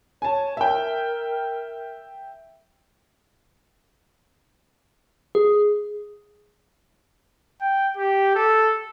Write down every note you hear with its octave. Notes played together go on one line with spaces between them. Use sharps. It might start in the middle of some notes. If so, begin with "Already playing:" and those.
C#5 G#5 A5
A#4 E5 G5
G#4
G5
G4
A4